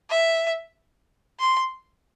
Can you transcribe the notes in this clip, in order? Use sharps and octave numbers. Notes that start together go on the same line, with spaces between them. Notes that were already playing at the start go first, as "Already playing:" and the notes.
E5
C6